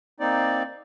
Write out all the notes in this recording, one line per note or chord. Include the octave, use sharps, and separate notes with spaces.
A#3 C4 D#4 D5